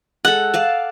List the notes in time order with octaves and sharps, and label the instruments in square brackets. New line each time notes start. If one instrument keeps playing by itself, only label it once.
[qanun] G#3 A4 [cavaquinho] F#5
[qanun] D5 F5 A5